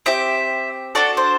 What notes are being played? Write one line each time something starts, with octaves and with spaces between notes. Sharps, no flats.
C4 G4 E5
D4 F#4 A4 D5
C5